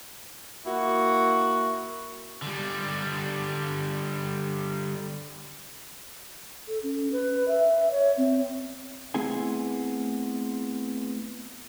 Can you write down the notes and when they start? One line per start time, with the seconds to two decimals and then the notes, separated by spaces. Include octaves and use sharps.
0.65 A#3 E4 F#4
2.42 D3 G3
6.68 A4
6.83 C#4
7.12 B4
7.48 E5
7.91 C#5
8.17 C4
9.14 A3 B3 C4 E4 G#4 G#5